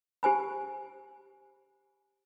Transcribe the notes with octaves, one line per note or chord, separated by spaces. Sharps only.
G4 C5 G#5 B5